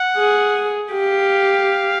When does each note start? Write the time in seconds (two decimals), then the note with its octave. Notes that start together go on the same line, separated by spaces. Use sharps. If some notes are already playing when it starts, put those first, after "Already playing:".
Already playing: F#5
0.17 G#4
0.92 G4 F5